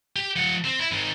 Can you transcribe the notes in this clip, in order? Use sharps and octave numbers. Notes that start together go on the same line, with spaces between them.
G4
F3 F#5
C4
E4
D#3 C4